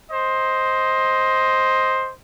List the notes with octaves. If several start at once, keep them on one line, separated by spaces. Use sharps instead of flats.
C5 D#5